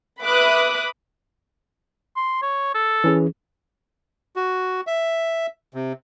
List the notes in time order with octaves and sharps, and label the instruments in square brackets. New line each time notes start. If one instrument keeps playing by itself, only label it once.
[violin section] B4 E5 B5 D6 D#6 F#6
[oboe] C6
C#5
A4
[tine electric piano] E3 C#4 G#4
[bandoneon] F#4
E5
C3